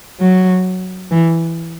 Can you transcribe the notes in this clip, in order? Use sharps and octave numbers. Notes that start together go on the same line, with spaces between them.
F#3
E3